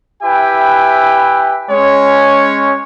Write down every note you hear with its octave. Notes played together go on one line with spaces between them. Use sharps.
E4 G4 B4 E5 G5 G#5
G#3 C#4 C#5